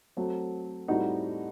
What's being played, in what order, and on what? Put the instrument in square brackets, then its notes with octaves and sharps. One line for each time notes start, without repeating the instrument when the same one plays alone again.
[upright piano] F#3 A3 C4
A2 G3 C4 D#4 F#4